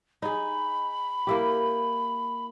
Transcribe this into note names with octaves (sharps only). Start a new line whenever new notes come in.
D#4 G#4 B5
A#3 E4 G4